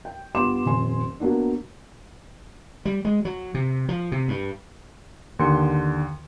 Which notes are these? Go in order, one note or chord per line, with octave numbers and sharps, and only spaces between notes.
G5
G2 B3 F4 C6 D6 E7
D#1 F2 G#5 C6
F#3 A#3 B3 D4
G3
G#3
F#3
C3
F3
C3
G2
D#2 D3 C6 C#7